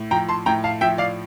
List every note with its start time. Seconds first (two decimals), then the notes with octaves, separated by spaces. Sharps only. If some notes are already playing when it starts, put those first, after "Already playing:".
Already playing: A2
0.11 F3 G5 A#5
0.29 A5 C6
0.46 A2 G5 A#5
0.64 F5 A5
0.81 F3 E5 G5
0.98 D5 F5